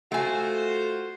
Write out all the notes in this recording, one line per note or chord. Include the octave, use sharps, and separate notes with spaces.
A3 F4 F#4 C5 G#5